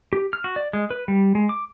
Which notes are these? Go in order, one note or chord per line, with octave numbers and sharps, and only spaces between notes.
G4
F6
F#4
D5
G#3
B4
G3
G#3
D6